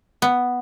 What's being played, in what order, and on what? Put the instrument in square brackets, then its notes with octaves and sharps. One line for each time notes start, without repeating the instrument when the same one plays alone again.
[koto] B3